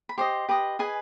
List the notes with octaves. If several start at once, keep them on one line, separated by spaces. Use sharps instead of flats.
B5
G4 C5 D#5 C6
G4 B4 D#5
G#4 B4 D#5 G#5